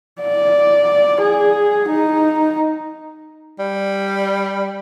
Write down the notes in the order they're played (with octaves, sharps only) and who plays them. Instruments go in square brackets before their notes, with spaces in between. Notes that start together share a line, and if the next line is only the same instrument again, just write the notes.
[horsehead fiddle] D5
G#4
D#4
[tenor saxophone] G3